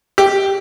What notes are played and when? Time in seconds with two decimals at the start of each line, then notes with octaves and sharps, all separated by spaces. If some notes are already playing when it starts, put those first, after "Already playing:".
0.18 G4